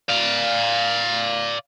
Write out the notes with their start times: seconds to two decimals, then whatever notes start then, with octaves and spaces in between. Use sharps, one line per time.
0.10 D5 F5